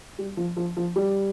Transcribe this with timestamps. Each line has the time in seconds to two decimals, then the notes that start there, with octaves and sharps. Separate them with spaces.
0.18 G3
0.37 F3
0.57 F3
0.77 F3
0.96 G3